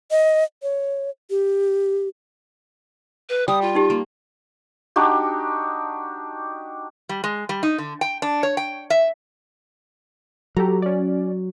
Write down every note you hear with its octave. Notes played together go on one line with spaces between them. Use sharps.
D#5
C#5
G4
B4
G3 D#6
F4
D#4 G4
A#3
D4 D#4 F#4 G4
G3
G#3
G3
D#4
D3
G5
D4
C#5
G5
E5
F#3 G4 A4 A#5
C#4 D5